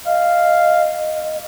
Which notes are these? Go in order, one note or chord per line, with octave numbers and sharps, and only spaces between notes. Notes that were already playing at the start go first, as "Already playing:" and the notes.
D#5 F5